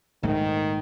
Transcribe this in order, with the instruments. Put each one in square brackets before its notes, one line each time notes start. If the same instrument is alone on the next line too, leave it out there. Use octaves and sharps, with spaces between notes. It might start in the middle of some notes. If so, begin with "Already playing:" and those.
[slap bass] A#1 G#2 A3 [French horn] D#3